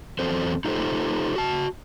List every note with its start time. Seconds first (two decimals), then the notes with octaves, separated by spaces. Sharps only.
0.19 E2 F#3 C4 A4 C5
0.65 D#4 F4 G4 A4 C5
1.36 F#4 A5